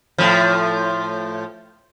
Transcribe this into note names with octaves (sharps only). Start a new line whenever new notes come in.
A2 F3